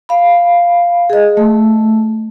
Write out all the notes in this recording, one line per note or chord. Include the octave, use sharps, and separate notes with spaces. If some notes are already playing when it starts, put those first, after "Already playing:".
F5 B5
G#4 D#5
A3